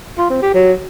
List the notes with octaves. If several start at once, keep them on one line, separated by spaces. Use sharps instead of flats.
F4
C4
G4
F#3